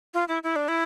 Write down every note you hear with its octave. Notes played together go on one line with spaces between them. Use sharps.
F4
E4
E4
D4
E4